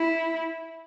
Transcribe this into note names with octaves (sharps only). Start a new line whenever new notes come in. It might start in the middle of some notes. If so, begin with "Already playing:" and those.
Already playing: E4